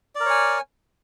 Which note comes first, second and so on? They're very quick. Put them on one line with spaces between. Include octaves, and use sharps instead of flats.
D5 A#4 C#5 G#5